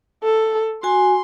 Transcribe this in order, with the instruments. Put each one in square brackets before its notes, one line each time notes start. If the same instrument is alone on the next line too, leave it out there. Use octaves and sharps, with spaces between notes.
[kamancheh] A4
[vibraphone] F#4 G#5 [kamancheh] C6